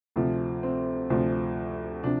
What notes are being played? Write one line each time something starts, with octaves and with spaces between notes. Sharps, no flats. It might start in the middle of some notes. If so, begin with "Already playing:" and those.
D2 C3 F3
C4
D2 C3 F3
C3 F3 D4